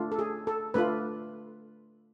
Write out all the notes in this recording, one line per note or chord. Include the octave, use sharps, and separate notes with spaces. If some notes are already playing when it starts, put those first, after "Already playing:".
Already playing: A3 D4 F4
A4
G#4
A4
A3 D4 F4 B4